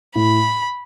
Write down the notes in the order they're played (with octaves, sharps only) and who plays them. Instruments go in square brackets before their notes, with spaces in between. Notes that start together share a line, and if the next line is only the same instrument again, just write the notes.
[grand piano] A2 [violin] B5